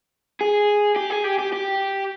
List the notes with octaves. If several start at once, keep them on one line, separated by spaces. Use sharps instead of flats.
G#4
G4
G#4
G4
G4
G4